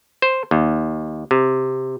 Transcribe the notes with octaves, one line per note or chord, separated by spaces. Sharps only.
C5
D#2
C3